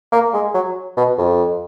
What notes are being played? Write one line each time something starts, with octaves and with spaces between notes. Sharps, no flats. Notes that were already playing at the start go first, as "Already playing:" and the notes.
A#3
G#3
F#3
B2
F2